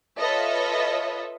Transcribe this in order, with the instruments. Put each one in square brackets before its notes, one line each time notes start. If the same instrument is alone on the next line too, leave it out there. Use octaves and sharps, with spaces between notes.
[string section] F4 A4 B4 C#5 D#5 E5